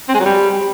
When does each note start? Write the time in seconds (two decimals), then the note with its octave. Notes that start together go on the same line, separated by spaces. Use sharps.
0.09 C4
0.14 G#3
0.20 F#3
0.26 G3